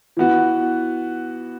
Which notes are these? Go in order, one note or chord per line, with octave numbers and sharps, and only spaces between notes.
E3 B3 F#4